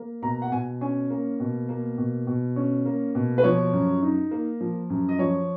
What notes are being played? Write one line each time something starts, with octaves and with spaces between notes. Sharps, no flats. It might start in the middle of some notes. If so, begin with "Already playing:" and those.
Already playing: A#3
B2 A#5
F#5
B2 G#5
C#4 G#5
A#3
B2
A#3
B2
B2
C#4
A#3
B2
B4
F3 C#5
F#2
D#4
A#3
F3
F#2
D#5
F3 C#5